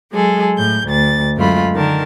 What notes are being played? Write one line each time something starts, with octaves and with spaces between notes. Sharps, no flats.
F#3 G#3 G#4 A4
A2 G6
D2 A6
F#2 G#3 A3 F4 B5
D3 D#3 A#4 A5